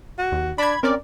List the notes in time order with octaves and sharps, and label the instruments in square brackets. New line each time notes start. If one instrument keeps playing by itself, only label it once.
[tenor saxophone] F#4
[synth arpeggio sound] D#2
[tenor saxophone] D4 [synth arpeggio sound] B5 G#6
[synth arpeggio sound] C4 C#4 D5 [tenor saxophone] A#4